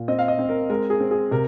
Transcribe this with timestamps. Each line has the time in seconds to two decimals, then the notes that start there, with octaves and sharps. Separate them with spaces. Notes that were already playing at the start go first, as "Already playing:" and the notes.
Already playing: A#2
0.08 C4 D#5
0.19 F5
0.28 D#5
0.39 C4
0.49 A#4
0.70 G#3 A#4
0.90 G#4
1.00 C4
1.11 G#4
1.31 C3 A#4